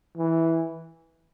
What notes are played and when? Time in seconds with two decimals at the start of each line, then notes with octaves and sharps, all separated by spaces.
0.17 E3